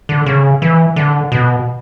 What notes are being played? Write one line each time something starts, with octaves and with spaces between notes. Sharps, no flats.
D3
C#3
E3
D3
B2